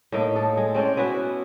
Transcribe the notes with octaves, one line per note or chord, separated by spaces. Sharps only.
A2 A#3 D#4
A4
G#3
C4 C#4 C5 D5
B3 E4 F#4 B4